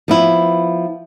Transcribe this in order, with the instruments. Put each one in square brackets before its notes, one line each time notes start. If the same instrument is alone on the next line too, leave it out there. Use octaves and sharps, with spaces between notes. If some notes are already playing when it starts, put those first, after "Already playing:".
[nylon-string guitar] F3 B3 E4